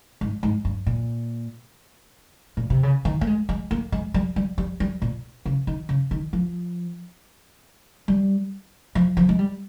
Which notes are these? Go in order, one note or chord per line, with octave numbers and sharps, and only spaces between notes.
G#2
G#2
G2
A#2
A#2
C3
C#3
D#3
A#3
G#3
G#3
A#3
G#3
G3
G3
G3
G3
A#2
C#3
D#3
C#3
D#3
F3
G3
F3
F3
G#3
G3